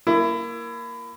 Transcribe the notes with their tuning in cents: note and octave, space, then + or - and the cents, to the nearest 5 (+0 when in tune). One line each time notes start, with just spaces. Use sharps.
A#3 +0 E4 +25